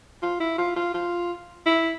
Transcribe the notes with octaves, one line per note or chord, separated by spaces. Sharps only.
F4
E4
F4
F4
F4
E4